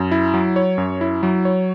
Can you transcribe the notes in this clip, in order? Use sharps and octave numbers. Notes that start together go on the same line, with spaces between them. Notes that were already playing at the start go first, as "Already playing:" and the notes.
Already playing: F#2
E4
F#3
C#5
F#2
E4
F#3
C#5